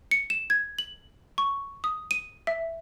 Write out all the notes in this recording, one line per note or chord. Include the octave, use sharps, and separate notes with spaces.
C#7
E7
G#6
F#7
C#6
D#6
D#7
E5